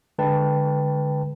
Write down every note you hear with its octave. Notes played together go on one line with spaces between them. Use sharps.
D3 G#3 B4 G5 A5